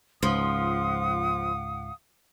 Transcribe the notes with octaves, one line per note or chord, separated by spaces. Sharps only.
C#2 G#2 F3 F5 F#5 D#6